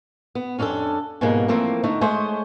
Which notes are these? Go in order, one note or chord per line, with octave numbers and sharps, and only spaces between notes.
B3
F2 C#4 D4 F#4 A4
G#2 B2 F3 G3 G#3 A#3
E3 F3 A3 A#3 C4
D3 A3 D#4
G#3 A3 C5 C#5 D#5